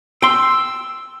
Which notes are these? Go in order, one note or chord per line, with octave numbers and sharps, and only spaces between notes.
G5 C6 E6